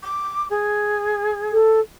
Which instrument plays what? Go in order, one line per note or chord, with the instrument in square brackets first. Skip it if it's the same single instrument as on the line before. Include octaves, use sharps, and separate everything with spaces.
[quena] D6
G#4
[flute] A4